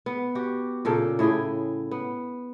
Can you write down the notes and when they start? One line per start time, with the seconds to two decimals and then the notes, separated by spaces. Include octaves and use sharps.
0.06 B3
0.35 F#4 G4
0.85 A#2 C#3 A4 G5
1.19 A2 E4 G#4 G5
1.91 B3